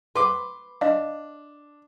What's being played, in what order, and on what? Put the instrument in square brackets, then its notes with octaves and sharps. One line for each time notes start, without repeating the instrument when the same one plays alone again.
[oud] B4 [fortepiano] C6 D6
[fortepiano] D4 [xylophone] D#5 F5